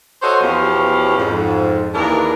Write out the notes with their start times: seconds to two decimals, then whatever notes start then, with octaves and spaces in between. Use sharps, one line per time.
0.22 F#4 A4 C5 C#5 D#5 E5
0.41 E2 B2 F3 C#4 G4 F5
1.18 F2 G#2
1.93 D#2 E3 D4 G#4 A#4